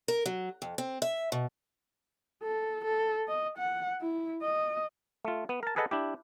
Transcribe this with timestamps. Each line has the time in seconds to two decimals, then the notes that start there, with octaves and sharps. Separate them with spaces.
0.08 A#4
0.26 F#3
0.62 F2
0.78 C4
1.02 E5
1.32 B2
2.43 A4
2.84 A4
3.28 D#5
3.58 F#5
4.01 E4
4.42 D#5
5.25 A3 F4
5.49 B3
5.63 A#4 A5
5.76 G#4 A4 B4 D#5 F#5 A5
5.91 D4 E4 G4